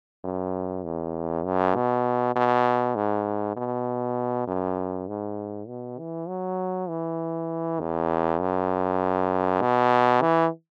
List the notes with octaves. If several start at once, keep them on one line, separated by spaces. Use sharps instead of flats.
F#2
E2
F#2
B2
B2
G#2
B2
F#2
G#2
B2
E3
F#3
E3
E2
F#2
B2
E3